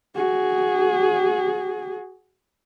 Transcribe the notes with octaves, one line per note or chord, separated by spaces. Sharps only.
F#4 G#4